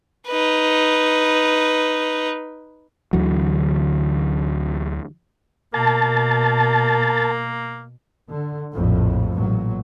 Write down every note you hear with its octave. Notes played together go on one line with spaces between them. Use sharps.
D#4 B4
D2 D3 E3 F#3
B2 A#3 A#4 A5
D3
A#1 F2 A2
A1 A#2 F#3